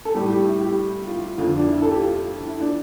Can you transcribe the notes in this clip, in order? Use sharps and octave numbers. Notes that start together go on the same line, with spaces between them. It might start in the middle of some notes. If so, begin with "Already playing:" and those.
A4
A2 G3 G4
G4
E4
G4
F4
F2 D3 F3 F4
D4
E4
A4
G4
F4
E4
F3 D4